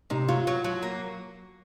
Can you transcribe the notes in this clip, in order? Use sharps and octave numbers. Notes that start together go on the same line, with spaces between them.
C3 D#4
F#3 F4
F#3
F#3
A#3